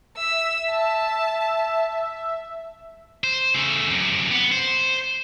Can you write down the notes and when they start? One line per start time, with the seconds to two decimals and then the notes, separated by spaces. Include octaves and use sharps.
0.17 E5 E6
0.70 A5
3.24 C5
3.54 C#3 A3
3.90 F#2 C3
4.31 B3
4.52 C5